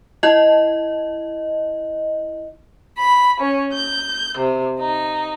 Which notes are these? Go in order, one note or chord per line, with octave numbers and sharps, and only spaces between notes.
E4 D#5
B5
C#4
G6
C3
D#4